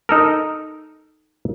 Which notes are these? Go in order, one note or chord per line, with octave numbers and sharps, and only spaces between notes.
D#4 A4 A#4